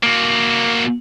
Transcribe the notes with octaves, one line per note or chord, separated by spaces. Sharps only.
A#3 F#4